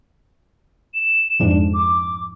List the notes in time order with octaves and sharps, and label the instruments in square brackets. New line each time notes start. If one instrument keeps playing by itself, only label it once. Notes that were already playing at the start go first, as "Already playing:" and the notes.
[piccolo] E7
[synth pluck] F2 G#2 D4
[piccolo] D6